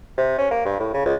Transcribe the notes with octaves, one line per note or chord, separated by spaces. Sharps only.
C3
C#4
A#3
G2
A2
C#3
C#2